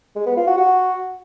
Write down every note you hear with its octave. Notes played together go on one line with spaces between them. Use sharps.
G#3
B3
F4
F#4
F#4